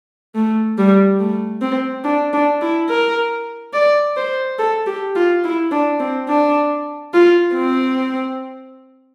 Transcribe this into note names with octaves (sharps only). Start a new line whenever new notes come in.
A3
G3
A3
C4
D4
D4
E4
A#4
D5
C5
A4
G4
F4
E4
D4
C4
D4
F4
C4